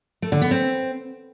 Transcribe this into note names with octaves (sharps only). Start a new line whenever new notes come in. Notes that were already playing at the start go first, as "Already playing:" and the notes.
A3
D3
B3
C4